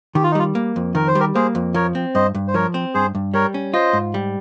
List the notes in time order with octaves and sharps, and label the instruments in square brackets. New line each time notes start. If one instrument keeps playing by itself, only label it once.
[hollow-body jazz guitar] D#3 [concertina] G4
[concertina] F4
D#4
[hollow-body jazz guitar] G3 [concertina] F4
[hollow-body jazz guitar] A#3
F2
[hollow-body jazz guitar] D#3 [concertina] A#4
[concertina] C5
[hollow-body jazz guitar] G3 [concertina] G4 A#4
[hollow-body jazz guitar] A#3 [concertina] G#4 C5
[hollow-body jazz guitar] F2
[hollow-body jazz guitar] F3 [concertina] A#4 C#5
[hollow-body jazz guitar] C4
[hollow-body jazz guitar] G2 [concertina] C5 D#5
[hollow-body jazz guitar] G2
[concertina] C5
[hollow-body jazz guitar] F3 [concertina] A#4 C#5
[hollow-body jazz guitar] C4
[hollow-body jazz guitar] G2 [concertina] G#4 C5
[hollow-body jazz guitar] G2
[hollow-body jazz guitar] G3 [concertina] A#4 C#5
[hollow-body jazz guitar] C#4
[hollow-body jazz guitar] F4 [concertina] C5 D#5
[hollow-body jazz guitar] G#2
G3